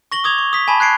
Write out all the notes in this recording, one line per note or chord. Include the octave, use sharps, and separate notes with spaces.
C#6 A#6 F#7 G7
D6 D#6 G#6 F7
C#6
D#6 B6
G#5 A5 B5
F#6 G#6 C7 D7